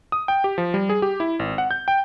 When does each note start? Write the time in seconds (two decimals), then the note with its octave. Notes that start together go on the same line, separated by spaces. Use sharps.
0.12 D#6
0.28 G5
0.44 G4
0.58 F3
0.74 G3
0.89 G#4
1.02 G4
1.20 E4
1.39 G#1
1.58 F#5
1.71 G6
1.88 G5